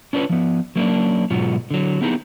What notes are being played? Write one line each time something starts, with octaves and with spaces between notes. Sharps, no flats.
C#4 D4 F4 B4 C#5
F3 B3
F#3 A#3 C#4 D4
G#2 B2 F#3 F4 F#4
D3 F#3
B3 D#4 E4 G4 G#4 A#5